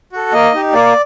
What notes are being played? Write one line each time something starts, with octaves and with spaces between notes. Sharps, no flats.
F#4 A4
A#3 D#5
D#4 G4
A#3 D5